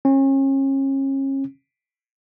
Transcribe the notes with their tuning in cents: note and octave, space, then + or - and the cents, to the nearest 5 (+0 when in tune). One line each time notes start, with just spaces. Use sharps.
C#4 -35